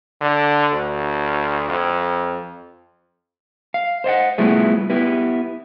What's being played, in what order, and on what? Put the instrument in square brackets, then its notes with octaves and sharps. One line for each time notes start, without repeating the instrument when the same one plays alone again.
[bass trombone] D3
D2
F2
[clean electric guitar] F5
C5 D#5 F5 F#5
G3 A3 B3 E4 F4 G#4
B3 E4 G4 B4